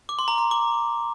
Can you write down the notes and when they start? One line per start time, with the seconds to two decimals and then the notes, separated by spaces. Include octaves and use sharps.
0.09 D6
0.19 C6
0.28 A#5
0.38 C6
0.51 D6